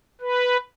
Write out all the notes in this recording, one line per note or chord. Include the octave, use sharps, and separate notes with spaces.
B4